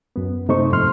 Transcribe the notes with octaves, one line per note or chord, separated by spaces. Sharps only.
F#2 B3
F#2 C3 A3 D#4 C5 C#6
F2 G#2 F3 C6 F6